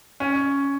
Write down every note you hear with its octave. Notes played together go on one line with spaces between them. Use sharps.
C#4